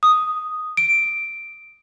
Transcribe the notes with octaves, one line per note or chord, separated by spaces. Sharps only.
D#6
D7